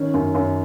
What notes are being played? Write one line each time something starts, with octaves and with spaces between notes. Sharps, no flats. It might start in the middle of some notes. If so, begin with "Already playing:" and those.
Already playing: D#3 C#4
F#2
F#2